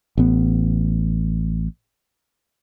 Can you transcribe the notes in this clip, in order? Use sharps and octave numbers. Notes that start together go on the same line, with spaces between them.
A1 B3